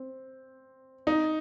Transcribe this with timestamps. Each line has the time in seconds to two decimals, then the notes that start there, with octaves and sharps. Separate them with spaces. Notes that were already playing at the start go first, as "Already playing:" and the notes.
Already playing: C4
1.07 D#4